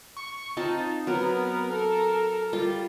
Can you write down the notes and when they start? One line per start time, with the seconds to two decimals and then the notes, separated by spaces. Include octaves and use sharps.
0.17 C#6
0.57 C4 D#4 F4 A5
1.07 F#3 B3 A#4
1.71 A4 A#4
2.53 G3 F4